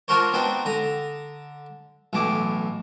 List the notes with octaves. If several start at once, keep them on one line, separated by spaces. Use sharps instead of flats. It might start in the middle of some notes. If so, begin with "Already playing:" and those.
D4 F4 F#4 A#4 C5 C#5
B3 C4 D4 D#4 F#4 C5
D3 A#5 D#6
B1 A2 E3 D6